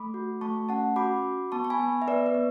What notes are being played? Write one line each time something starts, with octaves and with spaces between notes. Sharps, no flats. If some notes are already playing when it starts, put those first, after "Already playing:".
Already playing: A3 B5 D6
F#4
A3 A5 C#6
C#4 F#5 A5
F#4 B5 D6
F#4
B3 A5 C#6
C#6
G#5 B5
B3
E5
B3 B4 D5
B4
B3